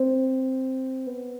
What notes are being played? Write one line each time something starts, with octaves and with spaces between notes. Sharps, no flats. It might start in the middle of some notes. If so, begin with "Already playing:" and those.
Already playing: C4
B3